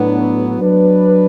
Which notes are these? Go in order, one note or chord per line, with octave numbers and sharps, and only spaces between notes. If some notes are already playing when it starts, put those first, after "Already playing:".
Already playing: A2 F#3 B3 D4
F#3 D4 B4